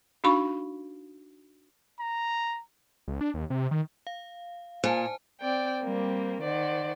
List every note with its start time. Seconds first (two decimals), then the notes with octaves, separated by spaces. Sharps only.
0.24 D4 D#4 F#4 F5 B5 C#6
2.00 A#5
3.08 C#2
3.21 D4
3.34 D#2
3.50 C3
3.71 D#3
4.07 F5
4.84 A#2 C5 G#5 A5
5.40 C4 D5 G5
5.83 G3 A#3 C4
6.42 D#3 C5 D5 F#5